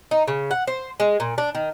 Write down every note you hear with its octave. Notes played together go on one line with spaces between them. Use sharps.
D#4
C#3
F#5
C5
G#3
A#2
D4
D#3